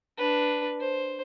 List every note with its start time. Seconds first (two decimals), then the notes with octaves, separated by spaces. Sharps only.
0.18 D4 B4
0.80 C5